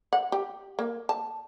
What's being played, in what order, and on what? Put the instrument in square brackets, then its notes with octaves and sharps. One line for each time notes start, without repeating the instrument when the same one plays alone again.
[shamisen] F#5
G4
A#3
A5